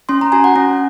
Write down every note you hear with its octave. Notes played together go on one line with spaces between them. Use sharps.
C#4 C6
A#5
F#4 G#5
F#5
C#4